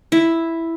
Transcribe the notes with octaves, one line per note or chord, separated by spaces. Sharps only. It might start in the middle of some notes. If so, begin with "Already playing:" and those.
E4